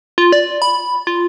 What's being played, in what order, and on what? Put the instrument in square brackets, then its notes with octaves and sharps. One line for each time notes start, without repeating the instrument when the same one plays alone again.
[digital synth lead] F4
D5
B5
F4